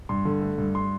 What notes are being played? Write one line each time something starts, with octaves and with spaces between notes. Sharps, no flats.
G2 C6
D3
A3
G2
C6